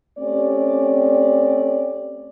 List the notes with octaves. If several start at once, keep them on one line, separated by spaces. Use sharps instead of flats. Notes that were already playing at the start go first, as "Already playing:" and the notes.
A3 C4 C#4 G4 D5